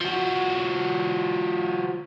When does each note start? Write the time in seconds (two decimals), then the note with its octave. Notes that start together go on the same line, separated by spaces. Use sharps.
0.01 F3 F#4